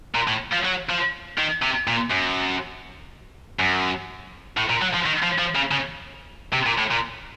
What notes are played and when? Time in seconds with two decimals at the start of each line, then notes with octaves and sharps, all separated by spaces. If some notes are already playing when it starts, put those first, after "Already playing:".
0.15 A#2
0.28 A2
0.52 F3
0.64 F#3
0.89 F3
1.38 D#3
1.62 C3
1.87 A#2
2.11 F#2
3.59 F#2
4.57 A2
4.70 A#2
4.82 F#3
4.94 F3
5.06 D#3
5.23 F3
5.39 F3
5.56 C#3
5.72 C#3
6.53 C3
6.66 A#2
6.78 A2
6.91 A#2